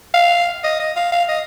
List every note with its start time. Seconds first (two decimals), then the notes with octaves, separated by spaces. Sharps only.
0.14 F5
0.64 D#5
0.80 D#5
0.96 F5
1.12 F5
1.29 D#5